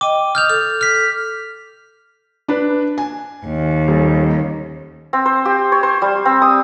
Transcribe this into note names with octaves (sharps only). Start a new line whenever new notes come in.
D#5 G5 D6
D#6 F6 G6 F7
A4 F7
F6 B6
D4 B4
G#5
D#2
D#1
C4
C5
G4
C#5
C5
G3
C4
D#6